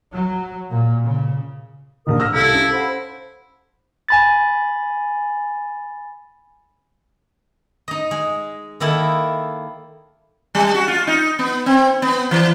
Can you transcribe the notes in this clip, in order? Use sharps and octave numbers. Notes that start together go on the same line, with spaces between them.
F#3
A#2
C#3
E1 A#1 A#4 D#6
E6 F6 A#6
C2 E4 A4 F5
C#4
C5 F#5 B5
G#5 B5 A6
D#4 D#5
G#3
D#3 A#3 E4 A4
G3
F#4
F4
D#4
B3
C4
B3
E3